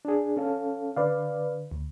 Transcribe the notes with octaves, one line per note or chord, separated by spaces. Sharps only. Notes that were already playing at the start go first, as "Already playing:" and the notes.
D4 G#4
C#4 A4 F5
D3 B4 D5 F5
D2